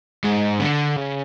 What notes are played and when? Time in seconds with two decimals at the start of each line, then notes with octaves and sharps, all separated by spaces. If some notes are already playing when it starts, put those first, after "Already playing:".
0.24 G#2
0.60 D3
0.97 C#3